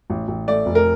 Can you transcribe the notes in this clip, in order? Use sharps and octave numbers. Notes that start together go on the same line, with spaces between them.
A1
A1
A3 D5
F1
A#4